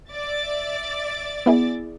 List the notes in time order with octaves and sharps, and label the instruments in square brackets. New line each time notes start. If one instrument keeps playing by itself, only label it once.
[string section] D5 E5 A6
[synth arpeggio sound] B3 E4 G#4